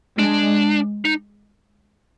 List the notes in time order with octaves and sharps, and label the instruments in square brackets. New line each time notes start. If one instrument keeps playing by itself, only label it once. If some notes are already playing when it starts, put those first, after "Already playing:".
[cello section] G#3 [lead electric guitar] D4
[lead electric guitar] D#4